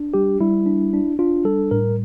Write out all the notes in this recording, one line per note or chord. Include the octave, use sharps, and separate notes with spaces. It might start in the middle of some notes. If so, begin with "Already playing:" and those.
Already playing: D4
G3 G4
G3 E4
D4
D4
D4 F4
G3 A4
A2 A#4